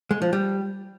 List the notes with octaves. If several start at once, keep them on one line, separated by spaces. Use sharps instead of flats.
G#3
F3
G3